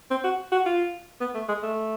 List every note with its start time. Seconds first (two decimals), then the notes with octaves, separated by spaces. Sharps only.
0.11 C4
0.24 F#4
0.52 F#4
0.66 F4
1.21 B3
1.35 A3
1.49 G#3
1.63 A3